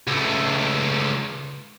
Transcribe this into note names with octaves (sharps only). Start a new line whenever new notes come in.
C#2 A3